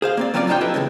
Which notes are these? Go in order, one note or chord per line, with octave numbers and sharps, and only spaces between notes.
G#4 C5 F5
A#3 C4 D5
F#3 C4 C#4 F4 A#4 D5
F2 A#2 D4 D#4 F4 G5
E4 F4 G4 A4 B4 D#5
E2 G#2 C#3 G#3